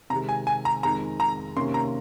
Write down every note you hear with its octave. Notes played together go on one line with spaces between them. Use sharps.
C3 D#3 G#3 A#5
G#5
G#5
A#5
F2 D#3 G#3 D#4 A#5
A#5
C3 D#3 A#3 C#4 C6
A#5